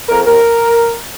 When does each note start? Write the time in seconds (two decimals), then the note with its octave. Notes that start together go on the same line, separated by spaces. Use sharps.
0.09 F2 A#4
0.26 D#2 A#4